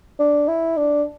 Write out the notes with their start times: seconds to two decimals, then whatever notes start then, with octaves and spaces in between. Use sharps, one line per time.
0.19 D4
0.48 E4
0.77 D4